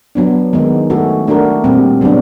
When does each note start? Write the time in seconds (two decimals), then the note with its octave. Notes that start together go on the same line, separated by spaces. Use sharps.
0.15 F#3 B3 D4
0.53 D#3 G#3 B3 D#4
0.90 A3 C#4 F#4 A4
1.27 A3 D4 F#4 A#4
1.64 A#2 G3 C4
2.01 C#3 F#3 B3 D4